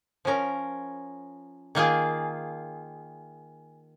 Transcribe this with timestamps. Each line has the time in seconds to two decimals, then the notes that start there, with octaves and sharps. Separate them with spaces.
0.25 F3 C#4 A#4
1.75 D#3 A#3 F4 G#4